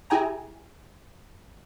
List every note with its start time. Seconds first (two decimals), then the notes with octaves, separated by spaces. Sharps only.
0.10 E4 G4 G#4 G5 G#5 A#5